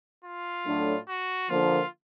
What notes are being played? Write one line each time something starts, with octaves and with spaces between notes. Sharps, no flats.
F4
A2 F#3 A3 D4
F#4
D3 F3 A#3 F4